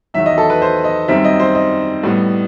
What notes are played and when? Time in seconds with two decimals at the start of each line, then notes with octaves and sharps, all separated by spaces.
0.14 E2 D#3 F#3 E5
0.26 D#5
0.38 A4
0.50 B4
0.62 C5
0.84 D#5
1.08 F#2 D#3 G3 C4 E5
1.24 D#5
1.40 C5
1.55 D#5
2.03 A2 G3 B3